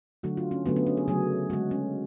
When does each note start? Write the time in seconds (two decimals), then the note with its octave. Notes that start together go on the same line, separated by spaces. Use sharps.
0.23 D3 F#3 A3 F#4
0.37 F4
0.51 C#4
0.66 D3 F#3 A3 B3
0.76 B3
0.87 C#4
0.97 G#4
1.08 C#3 F#3 A3 G#4
1.50 D3 G#3 F#4
1.71 C#4